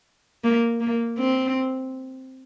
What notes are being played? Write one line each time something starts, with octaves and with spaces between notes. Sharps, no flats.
A#3
A#3
C4